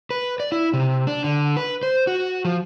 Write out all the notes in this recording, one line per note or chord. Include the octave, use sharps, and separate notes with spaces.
B4
D5
E4
C3
D4
D3
B4
C5
F#4
F3